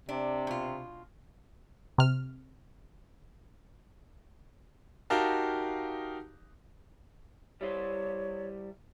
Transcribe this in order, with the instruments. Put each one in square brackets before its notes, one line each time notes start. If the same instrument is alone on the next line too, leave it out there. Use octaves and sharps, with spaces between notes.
[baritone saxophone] C3 [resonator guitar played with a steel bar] D4
[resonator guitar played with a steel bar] B2 F4
[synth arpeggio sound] C3 F6
[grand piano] D#4 F#4 G4 A#4 F5 A5
[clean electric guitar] G3 E4 C5 [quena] C#5